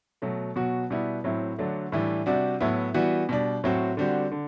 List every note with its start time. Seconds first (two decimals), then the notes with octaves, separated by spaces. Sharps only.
0.22 B2 F#3 A3
0.56 B2 F#3 B3 F#4
0.90 B2 G3 B3 E4
1.24 A2 F#3 C4 E4
1.58 D3 F#3 A3 D4
1.92 A2 E3 G3 D4
2.26 C3 G3 D4 F#4
2.60 A2 F#3 B3 E4
2.94 E3 G3 B3 F#4
3.29 B2 G3 D4
3.64 A2 F#3 C4 F#4
3.97 D3 G3 C4 F#4
4.31 D3